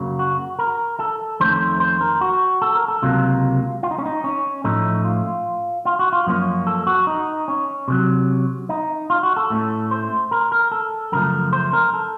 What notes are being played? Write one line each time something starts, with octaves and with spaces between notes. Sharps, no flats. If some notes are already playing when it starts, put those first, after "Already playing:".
Already playing: F#2 C#3 F#3 A#3
F#4
A#4
A4
F2 D#3 A3 C#4 C5
C5
A#4
F#4
A4
A#4
A4
C#2 C3 F#3 A#3 F4
F4
D#4
C#4
D#4
C#4
A2 F3 A3 C#4 D#4
F4
F4
F#4
F4
F#2 F3 A#3 C#4
A4
F#4
D#4
C#4
C3 D#3 F#3
D#4
F4
F#4
A4
A2 A3 C#4
C5
A#4
A#4
A4
F#2 C#3 F3 A3 A#4
C5
A#4
A4